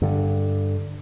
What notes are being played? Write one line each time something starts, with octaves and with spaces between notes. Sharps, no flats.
G2 D3